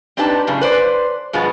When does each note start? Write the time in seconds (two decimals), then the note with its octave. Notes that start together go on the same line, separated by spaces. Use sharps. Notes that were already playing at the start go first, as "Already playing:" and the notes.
0.17 C4 D4 D#4 G4 B4 A5
0.47 F#2 A2 C#3
0.61 B4 C5 D5
1.33 G2 B2 F3 G#3 B3